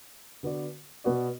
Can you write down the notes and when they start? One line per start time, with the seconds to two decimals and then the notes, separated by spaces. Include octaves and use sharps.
0.43 D3 B3 F#4 D5
1.04 B2 B3 F#4 D5